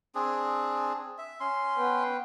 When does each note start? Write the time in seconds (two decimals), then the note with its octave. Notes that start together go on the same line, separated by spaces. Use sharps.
0.15 C4 D4 G#4
1.18 E5
1.40 C#4 C6
1.77 B3 B4 G5